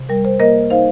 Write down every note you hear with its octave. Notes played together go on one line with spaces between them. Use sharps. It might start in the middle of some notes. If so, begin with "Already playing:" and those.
Already playing: C3
G3 A#4
C5
A#3 A#4 D#5
D#4 C5 F5